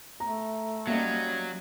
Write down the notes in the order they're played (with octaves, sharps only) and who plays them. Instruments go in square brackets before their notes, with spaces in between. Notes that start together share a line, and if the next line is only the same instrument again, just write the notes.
[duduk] A3 [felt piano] A#5
[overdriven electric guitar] F#3 [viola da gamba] G3 C#4 D#4 [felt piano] A#3